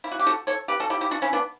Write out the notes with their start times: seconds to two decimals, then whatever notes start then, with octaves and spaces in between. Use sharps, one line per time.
0.04 E4
0.11 F#4
0.19 G4
0.26 F#4 A4
0.47 A4 C#5
0.68 G4 B4
0.80 F#4 A4
0.90 E4 G4
1.01 E4 G4
1.11 D4 F#4
1.22 C#4 E4
1.33 B3 D4